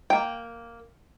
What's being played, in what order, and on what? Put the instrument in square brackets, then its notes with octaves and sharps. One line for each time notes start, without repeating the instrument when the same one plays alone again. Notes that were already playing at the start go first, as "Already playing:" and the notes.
[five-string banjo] A#3 G5